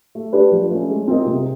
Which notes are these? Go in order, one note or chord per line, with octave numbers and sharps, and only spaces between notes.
A3
D4 G4 B4
F3
A3 C#4
G#3
C4 F4 A#4 D#5
C3